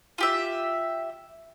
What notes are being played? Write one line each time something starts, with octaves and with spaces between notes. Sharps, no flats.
F4 G4 E5